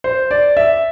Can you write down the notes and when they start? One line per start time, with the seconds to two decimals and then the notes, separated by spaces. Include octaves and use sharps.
0.04 C5
0.31 D5
0.57 E5